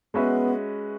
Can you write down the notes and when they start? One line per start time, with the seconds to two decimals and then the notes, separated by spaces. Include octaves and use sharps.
0.14 G#3 B3 C#4 F#4 B4 E5